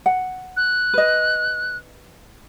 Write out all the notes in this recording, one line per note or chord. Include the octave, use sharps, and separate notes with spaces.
F#5
F#6
B4 D#5